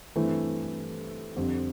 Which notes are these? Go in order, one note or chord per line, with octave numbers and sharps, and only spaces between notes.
G2 E3 A3 C4 E4
F2 D3 G3 C4